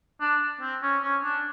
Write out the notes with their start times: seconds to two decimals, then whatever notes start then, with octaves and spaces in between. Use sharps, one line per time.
0.21 D4
0.61 C4
0.82 C#4
1.03 C#4
1.24 D4